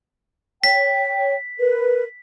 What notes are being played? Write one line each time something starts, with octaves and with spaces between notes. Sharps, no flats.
C#5 G5 B6
A#4 B4